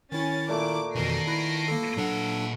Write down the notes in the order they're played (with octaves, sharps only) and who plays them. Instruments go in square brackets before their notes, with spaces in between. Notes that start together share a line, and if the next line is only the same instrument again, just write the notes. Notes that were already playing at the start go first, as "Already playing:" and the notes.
[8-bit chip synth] D#3 E4 [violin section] C#4 A6
[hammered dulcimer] A#2 A3 [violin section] D6
[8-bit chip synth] F2 B2 E3 [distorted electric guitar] D#3 A#4 [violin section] A#6 C7 D7
[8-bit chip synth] E4 [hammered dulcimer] B4
[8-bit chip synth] A#3 A4
[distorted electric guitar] A#2 F#5 [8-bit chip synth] F#3 D4 A4